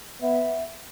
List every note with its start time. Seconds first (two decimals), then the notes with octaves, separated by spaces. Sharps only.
0.21 B3 E5